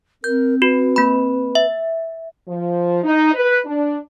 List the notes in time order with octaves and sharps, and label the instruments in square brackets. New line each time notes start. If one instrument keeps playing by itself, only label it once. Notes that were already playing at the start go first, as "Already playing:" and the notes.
[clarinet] C4 [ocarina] A#4 [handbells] G6
[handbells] F#4 [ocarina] B4
[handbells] A#3 B5
E5
[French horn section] F3
D#4
B4
D4